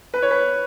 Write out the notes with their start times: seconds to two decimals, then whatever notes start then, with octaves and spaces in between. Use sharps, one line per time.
0.14 B4
0.22 C#5
0.31 B4